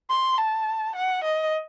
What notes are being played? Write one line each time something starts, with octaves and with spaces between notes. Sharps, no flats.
C6
A5
F#5
D#5